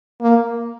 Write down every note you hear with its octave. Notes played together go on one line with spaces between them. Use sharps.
A#3